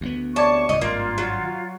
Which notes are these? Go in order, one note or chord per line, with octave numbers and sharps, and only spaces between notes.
D2 A3 B3
C3 C#5 D5 A5 C#6 D6 G#6
C#2 G#2 D#5
G#1 G2 A#3 F4
F#3